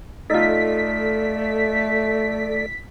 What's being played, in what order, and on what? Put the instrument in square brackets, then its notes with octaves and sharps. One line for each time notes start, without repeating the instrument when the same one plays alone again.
[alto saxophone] A3 [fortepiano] D#4 F4 [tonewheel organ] A4 D5 [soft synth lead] B6